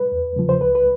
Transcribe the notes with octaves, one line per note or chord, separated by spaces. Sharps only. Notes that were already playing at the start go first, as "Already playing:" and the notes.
Already playing: B4
E2
C#3 F3
C5
C#2 B4
B4